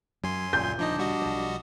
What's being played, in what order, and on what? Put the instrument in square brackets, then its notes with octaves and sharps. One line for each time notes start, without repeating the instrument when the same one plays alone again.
[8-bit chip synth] F#2 G#5 C6 [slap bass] F#3
[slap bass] D#1 D2 C#3 [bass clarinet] A#2 [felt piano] G6
[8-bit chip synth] F3 D#4 D#5 [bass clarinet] D4
[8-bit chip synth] G3 F#4 D#5
[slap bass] B1 F3